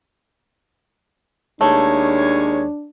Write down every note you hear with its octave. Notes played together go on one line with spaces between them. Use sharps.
D#2 G#3 A3 D4 C#5